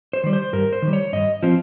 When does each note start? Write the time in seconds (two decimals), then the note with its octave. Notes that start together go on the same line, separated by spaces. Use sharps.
0.13 C5
0.24 D#3 G3
0.33 C5
0.53 G2 A#4
0.73 C5
0.82 D#3
0.88 G3
0.93 C#5
1.13 G2 D#5
1.43 F3 C4